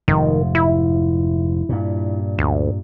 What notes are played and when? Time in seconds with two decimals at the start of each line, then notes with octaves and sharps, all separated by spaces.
0.08 F1 G#2 D#3
0.55 E4
1.69 G2 A#2
2.39 D2